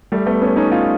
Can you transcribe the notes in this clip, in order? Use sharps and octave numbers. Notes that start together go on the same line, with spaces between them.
G3 A3
A3 B3
B3 C#4
C#4 D#4
D#4 F4